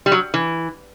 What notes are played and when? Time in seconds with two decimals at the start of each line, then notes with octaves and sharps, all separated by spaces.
0.06 G3
0.12 F#3
0.34 E3